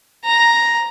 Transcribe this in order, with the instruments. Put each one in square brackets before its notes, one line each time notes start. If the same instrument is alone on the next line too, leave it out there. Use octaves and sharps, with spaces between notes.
[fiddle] A#5